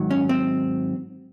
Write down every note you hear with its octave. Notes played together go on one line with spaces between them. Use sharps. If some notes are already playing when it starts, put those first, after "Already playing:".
Already playing: G#2 D#3 F#3
C#4
C4